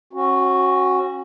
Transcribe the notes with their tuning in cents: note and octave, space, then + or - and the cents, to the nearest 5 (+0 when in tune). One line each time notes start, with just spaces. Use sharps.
C#4 -35 F#4 +0